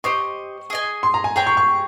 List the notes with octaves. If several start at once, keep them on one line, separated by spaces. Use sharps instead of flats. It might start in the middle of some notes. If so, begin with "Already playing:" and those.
G4 C5 D#5 C#6
G#4 D#5 G#5
C6
A#5
G#5
G#4 C#5 G5 A#5
C#6
C#6